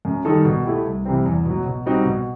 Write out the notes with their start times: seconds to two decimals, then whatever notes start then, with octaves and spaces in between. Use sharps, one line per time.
0.05 F#2
0.25 D#3 G3 D#4 A4
0.45 B2
0.65 A3 E4 G4
0.85 C2
1.05 C3 E3 G3 C4
1.26 E2
1.45 B2 F#3
1.66 B2
1.86 G3 C4 D#4 F#4
2.05 B2